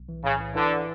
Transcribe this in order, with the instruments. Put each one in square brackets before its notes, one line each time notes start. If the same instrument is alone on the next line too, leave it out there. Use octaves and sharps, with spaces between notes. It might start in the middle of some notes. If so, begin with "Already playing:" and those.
Already playing: [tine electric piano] B1
E3
[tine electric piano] A2 [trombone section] C#3
[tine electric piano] E3
[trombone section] D3 [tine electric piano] E3